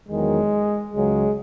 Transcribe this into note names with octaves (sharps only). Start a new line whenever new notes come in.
E2 D#3 F#3 G#3
C#2 C#3 F#3 G#3